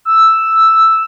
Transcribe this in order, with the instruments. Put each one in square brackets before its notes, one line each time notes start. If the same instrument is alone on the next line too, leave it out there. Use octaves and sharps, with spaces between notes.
[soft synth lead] E6